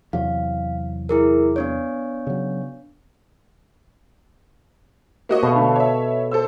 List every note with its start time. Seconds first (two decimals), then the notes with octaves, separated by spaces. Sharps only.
0.13 E2 C3 F#3 F5
1.09 E4 G#4 A#4
1.56 B3 D4 C#5
2.27 C#3 F#3
5.29 A#3 F#4 C#5 D#5 E5
5.43 B2 A4 B4 F5
5.56 D3 A3
5.76 C#5 E5
6.31 A4 C5 E6